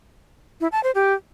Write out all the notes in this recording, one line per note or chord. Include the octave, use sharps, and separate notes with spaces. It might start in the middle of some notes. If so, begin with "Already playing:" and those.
E4
A5
C5
G4